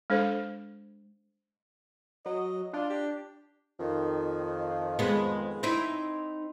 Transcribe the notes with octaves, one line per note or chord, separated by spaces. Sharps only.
G#3 D4 A4 C5
F#3 D#5
D4 F4
G4
F2 D#3 F3
G#3 B3
C4 D#4 E4